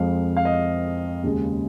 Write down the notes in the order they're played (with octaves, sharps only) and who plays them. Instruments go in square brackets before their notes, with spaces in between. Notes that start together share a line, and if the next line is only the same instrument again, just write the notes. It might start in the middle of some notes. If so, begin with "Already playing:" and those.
Already playing: [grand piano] F2 F3 G#3 F5
F5
D#5
D#2 C#3 G#3